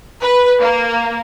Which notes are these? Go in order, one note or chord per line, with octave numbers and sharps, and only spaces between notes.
B4
A#3